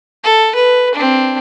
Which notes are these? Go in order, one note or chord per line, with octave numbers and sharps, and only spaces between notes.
A4
B4
C4 D4